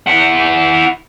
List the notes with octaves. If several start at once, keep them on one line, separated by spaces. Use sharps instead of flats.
E4 F#5